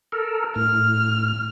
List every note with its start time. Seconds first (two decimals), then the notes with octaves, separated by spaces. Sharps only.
0.12 A4 A#4
0.56 A2 F6